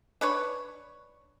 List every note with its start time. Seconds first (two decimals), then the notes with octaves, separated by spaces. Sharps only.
0.21 D4 B4 C#5